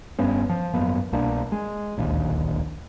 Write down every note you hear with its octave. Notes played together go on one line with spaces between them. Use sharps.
F1 G2 B3 C#4
F3
G#1 F#2 A#3 B3
C2 B2 A#3 D4
G#3
D1 A#1 D#2